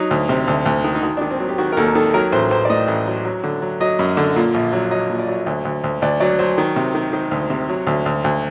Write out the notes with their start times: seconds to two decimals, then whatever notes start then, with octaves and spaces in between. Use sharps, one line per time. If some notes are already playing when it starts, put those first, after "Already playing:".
Already playing: F#3 D#4
0.11 D2
0.29 C3
0.48 D2
0.66 D2
0.84 D#3
0.95 D#4
1.03 D#3 F#4
1.17 D4
1.21 D#3
1.30 C4
1.40 F#3
1.49 G4
1.58 D#3 F#4
1.72 A#4
1.77 D#2 A4
1.95 D#3 A4
2.14 F#3 A#4
2.32 A1 C5
2.51 A1 C5
2.65 D5
2.70 A2 D#5
2.88 A1
3.07 F#3
3.25 F#3
3.43 D3
3.62 F#3
3.80 F#3 D#5
3.99 F#2
4.17 D3
4.36 A#2
4.54 A#1
4.73 F#3
4.91 F#3 D#5
5.10 A#2
5.19 D5
5.28 F#3
5.46 D2
5.65 D2
5.84 D2
6.02 D2 D5
6.20 F#3 D5
6.39 F#3 C5
6.58 D#3
6.76 C3
6.95 D#3
7.13 D#3 C5
7.31 D2
7.50 C3
7.69 F#3
7.87 D2
8.06 D2
8.24 D2